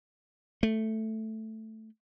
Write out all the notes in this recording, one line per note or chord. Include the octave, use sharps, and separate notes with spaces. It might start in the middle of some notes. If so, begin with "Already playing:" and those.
A3